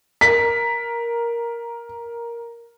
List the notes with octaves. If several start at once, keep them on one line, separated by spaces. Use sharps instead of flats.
A#4 B6